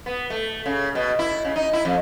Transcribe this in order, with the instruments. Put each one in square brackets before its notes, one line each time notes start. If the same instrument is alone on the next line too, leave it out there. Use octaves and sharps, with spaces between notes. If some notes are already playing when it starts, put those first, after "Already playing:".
[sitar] B3
A3
C#3
B2
E4
C#3
D#4
E4
F2